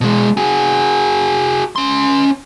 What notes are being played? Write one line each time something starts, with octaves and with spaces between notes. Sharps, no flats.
B2 G#3
F#4 G#4
C#4 C6